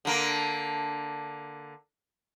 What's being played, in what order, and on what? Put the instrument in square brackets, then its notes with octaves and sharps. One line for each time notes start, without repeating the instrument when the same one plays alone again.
[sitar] D3 A#3